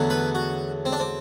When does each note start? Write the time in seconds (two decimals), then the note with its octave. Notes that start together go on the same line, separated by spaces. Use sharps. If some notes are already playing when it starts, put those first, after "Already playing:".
Already playing: E2 D3 F#3 A3
0.10 B4
0.35 F#4
0.85 C4
0.92 D4
1.00 C4